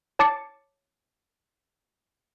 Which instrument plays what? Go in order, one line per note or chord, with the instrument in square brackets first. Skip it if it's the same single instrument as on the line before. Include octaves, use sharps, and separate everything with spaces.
[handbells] C#5 A5 D6 A6 C7 C#7